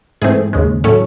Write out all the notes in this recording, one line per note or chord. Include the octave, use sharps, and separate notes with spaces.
G#2 E3 A3 C4 G#4
D#2 C#3 G#3
A2 F#3 A3 C#4 A4